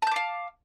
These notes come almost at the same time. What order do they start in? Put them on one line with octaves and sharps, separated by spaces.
A5 G6 D6 F5